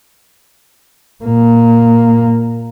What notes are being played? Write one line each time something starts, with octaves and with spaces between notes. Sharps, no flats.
A#2 A#3